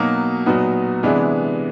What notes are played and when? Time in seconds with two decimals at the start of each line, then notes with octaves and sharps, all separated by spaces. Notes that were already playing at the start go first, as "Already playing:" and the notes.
Already playing: B2 F#3 A#3 D#4 F#4
0.46 A#2 F#3 B3 D#4 F#4
1.03 C3 E3 G#3 B3 D4